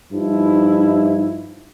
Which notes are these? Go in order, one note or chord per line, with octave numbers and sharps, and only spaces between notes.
G2 F3 D#4 E4